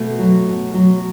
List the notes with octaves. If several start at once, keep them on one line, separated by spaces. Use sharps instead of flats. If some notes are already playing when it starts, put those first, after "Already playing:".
Already playing: B2 A3
F#3
B2
F#3